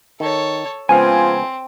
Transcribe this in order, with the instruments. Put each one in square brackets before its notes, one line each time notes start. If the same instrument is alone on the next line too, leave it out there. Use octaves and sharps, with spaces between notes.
[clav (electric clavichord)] D#3 [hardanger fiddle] A4 C#5
[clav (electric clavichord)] C#2 B3 F5 [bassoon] F3 [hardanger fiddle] C4 [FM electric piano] G#5